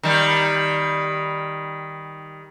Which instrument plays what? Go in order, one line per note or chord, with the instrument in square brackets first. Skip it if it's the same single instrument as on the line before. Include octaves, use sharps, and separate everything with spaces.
[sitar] D#3 G3